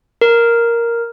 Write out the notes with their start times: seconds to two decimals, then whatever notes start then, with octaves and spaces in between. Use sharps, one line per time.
0.21 A#4